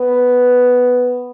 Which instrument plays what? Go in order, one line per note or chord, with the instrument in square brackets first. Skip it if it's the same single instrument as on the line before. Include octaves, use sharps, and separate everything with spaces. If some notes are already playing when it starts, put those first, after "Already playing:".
Already playing: [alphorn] B3